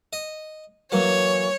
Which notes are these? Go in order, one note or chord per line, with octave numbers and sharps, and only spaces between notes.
D#5
E3 F#3 A#3 C#5